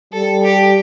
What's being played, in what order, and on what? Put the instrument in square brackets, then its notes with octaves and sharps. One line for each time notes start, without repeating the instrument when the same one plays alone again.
[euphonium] G3 [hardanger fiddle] A4
[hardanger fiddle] G4